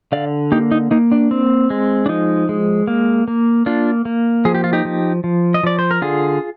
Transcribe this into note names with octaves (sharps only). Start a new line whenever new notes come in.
D3 D5 F5
A#3 D#4 G4
D#4
A#3 D#4
D4
C4
G#3
D4
F3 D#4
G#3
A#3
A#3
A#3 D4 F4
A#3
F3 G#4
G4
F4
D#4 G4
F3
F3
D#5
F3 D5
C5
A#4
D3 F4 G#4